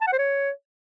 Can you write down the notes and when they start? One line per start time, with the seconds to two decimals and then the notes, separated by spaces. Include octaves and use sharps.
0.01 A5
0.07 F#5
0.13 C5
0.18 C#5